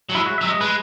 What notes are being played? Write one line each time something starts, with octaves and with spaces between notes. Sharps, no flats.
F#3
G#3 E4
F#4
F#3 E5
G#3
D#5
G#3 B4